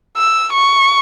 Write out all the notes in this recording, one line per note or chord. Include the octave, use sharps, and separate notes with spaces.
E6
C#6